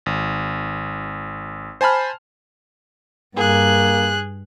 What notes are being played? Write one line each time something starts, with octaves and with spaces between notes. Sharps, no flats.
G#1
C5 G#5 A5 B5 F6
G2 A#3 G#4 F#6